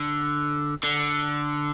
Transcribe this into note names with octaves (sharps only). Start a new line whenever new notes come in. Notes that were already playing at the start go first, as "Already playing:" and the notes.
Already playing: D3
D3